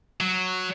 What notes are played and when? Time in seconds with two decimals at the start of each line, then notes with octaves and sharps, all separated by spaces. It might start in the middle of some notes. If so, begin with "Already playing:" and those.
0.21 F#3